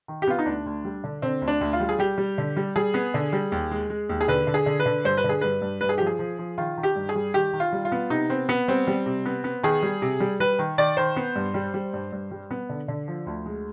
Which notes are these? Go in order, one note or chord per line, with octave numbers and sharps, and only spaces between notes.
D#3
G4
B3 F4
D#4
D2 D4
D2
G3
D3
D3 C4
D2
D4
D2
F4
G3
G#4
G3 G4
G3
D3
G3
G3 G#4
B3
D3
G3
D#2
G#3
G#3
D#2
G#4
D3 B4
D3
G#4
D3
B4
D3
G2 C5
B4
D3
G#4
G2 B4
G2
G2 B4
G#4
F3 G4
G#4
F3
F3
D#3 F4
D#3
G4
G2
G#4
G3
D#3 G4
D#3
F4
G3
F4
B3
C3 D#4
B3 C4
B3
G3 C4
G3
C3
B3
B3
D#3 G#4
G3
C3
G3
G3 B4
D#3
D#3 D5
D#3 C5
B3
G2
G3
G3
G2
G2
G3
B3
D3
D3
F3
D2
G#3